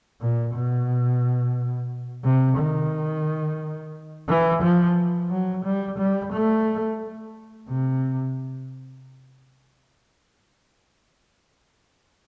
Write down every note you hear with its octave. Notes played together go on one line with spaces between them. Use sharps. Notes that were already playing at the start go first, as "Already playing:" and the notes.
A#2
B2
C3
D#3
E3
F3
F#3
G3
G3
A3
C3